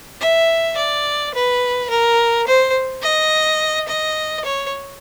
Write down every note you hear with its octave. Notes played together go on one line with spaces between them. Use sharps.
E5
D5
B4
A#4
C5
D#5
D#5
C#5